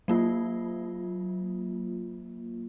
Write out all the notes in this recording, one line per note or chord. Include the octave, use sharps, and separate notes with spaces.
F#3 A#3 F4